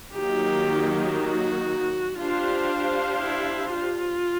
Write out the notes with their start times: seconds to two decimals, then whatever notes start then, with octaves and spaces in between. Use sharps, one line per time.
0.14 D#3 F#3 A#3 D#4 G4
1.16 F#4
2.18 D4 F4 G4 C5 F5
3.20 E4
3.71 F4